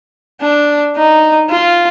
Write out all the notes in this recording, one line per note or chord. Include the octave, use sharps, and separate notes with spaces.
D4
D#4
F4